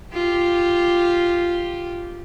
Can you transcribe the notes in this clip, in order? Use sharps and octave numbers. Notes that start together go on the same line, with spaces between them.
F4 G4